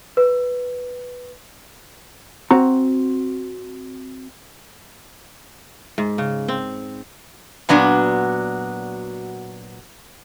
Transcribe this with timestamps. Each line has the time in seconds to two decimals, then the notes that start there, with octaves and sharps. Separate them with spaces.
0.17 B4
2.51 C4 F#4 A#5
5.98 G#2
6.18 C#3
6.48 C4
7.69 A#2 F#3 B3 D4 F#4